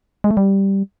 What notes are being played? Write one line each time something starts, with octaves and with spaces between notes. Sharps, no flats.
G#3
A3
G3